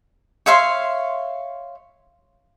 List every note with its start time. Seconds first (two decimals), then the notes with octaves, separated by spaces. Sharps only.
0.46 C#5 E5 F5 C6